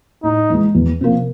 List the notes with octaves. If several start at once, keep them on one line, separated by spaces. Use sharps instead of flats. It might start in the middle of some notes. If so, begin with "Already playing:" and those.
A2 D#4
E3 G#3
E2
C3 F3 A#3